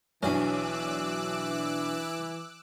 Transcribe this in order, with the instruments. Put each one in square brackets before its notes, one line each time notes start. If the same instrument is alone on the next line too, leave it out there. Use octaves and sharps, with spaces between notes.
[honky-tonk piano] B1 D4 [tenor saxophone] E3 [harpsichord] C#4 F#4 [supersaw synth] D6 E6 F#6